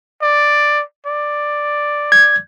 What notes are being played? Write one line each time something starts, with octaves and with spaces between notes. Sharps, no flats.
D5
D5
G#6